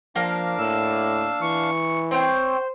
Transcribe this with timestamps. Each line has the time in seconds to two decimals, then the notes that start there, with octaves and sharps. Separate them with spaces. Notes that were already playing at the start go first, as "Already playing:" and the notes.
0.16 F3 A#3 D4 A#4 F5
0.59 A2 E6
1.42 E3 C#6
2.11 C4 C5 C#5 G5